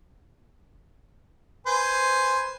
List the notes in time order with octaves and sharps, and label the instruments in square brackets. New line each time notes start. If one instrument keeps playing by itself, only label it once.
[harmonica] B4 C5 G#5